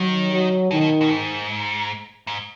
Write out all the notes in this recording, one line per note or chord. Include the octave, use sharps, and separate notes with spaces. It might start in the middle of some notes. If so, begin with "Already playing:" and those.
Already playing: D#3 F#3
F#3
B2 D#3
B2
B2
G#2
G#2